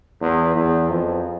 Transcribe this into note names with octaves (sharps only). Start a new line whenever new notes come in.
E2
E2
F2